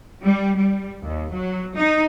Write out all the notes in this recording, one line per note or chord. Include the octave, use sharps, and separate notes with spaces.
G3
G3
D#2
F#3
D#4